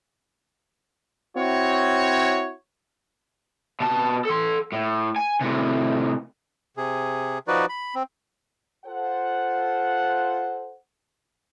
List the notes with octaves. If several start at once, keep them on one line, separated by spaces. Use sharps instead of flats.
C4 E4 F#4 C#5
B2 A5
A4 C6
A2
G#5
A2 C3
C3 G#4
F3 D#4 F#4 B4 D5
B5
C4
F4 A4 C5 F#5